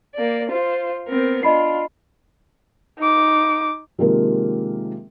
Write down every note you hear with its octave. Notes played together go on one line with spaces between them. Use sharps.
A#3 D5
F4 C5
B3 C4 A#4
D4 F4 D#5 B5 C7
D#4 D6
C3 D#3 F3 G#3 A#3 A#4